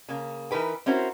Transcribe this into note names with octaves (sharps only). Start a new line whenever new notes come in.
C#3 A#3
E3 D#4 A#4 B4 G5
C4 C#4 E4 F#4 A#4 C5